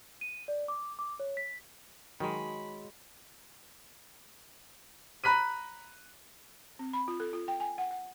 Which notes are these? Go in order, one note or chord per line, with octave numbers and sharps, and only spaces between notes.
D#7
D5
D6
D6
C#5
B6
D#3 F#3 G#3 B5
A#5 B5 F#6 B6 D#7
C4
B5
F4
A4
F4
G5
G#5
F#5
F#5